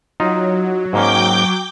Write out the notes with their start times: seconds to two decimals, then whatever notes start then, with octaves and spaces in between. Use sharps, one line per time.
0.20 F#3 D#4 F4
0.93 G#2 A#3 C#4 G5 D6 G6